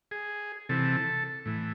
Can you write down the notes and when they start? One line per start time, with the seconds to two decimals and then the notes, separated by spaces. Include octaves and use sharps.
0.11 G#4
0.69 C3 E3 A4
1.46 A2 E3